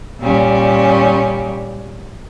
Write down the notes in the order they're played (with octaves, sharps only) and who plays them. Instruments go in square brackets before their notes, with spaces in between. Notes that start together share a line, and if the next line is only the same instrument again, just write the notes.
[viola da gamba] A#2 G3 C#4